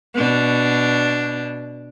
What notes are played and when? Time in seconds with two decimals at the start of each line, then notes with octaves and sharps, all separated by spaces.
0.15 B2 D4